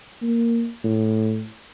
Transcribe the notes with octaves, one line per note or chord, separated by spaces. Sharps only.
A#3
A2